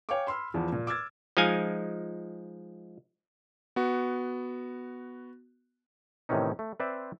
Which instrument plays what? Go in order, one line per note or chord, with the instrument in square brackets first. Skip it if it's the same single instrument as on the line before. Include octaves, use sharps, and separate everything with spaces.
[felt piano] C#5 F5 G5 G#5 C#6 D6
B5 C6 E6 F6
E2 F3 B3
A#2
D6 E6 F6 G#6 A6
[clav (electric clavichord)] F3 G#3 D#4 F5 G#5
[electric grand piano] B3 F#4
[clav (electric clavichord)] A2 C3 D#3 E3 C#4 D#4
A3
C4 B4 C5 D5 E5